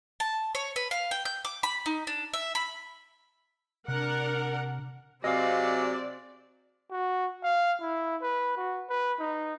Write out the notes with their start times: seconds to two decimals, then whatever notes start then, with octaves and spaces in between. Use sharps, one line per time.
0.20 A5
0.55 C#5
0.76 B4
0.91 F5
1.11 G5
1.25 G6
1.45 D6
1.63 B5
1.86 D#4
2.07 D4
2.33 E5
2.55 B5
3.88 C3 D4 A#4 F#5
5.24 C3 F#3 C4 G#4 D5 D#5 F5
6.91 F#4
7.43 F5
7.81 E4
8.22 B4
8.57 F#4
8.89 B4
9.19 D#4